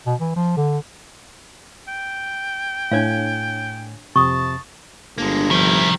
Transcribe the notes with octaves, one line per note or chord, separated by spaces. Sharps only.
B2
E3
F3
D3
G5
A2 D4 C#5 F5 G#5 G#6
F2 C3 A5 C#6 D#6
G1 G#3 A#3 D4
C2 D#3 F3 G3 E4